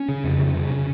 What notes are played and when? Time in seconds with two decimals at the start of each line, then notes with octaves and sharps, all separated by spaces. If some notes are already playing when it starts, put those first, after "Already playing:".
Already playing: C#4
0.08 C#3
0.24 F2
0.39 C#3
0.55 C#3
0.71 C#3